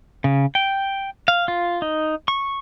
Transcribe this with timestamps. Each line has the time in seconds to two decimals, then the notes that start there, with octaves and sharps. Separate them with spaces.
0.24 C#3
0.55 G5
1.28 F5
1.48 F4
1.82 D#4
2.28 C#6